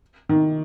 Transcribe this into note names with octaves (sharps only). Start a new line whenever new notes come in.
D#3